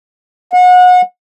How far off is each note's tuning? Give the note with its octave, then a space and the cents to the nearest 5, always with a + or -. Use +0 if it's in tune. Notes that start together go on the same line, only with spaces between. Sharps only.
F#5 -30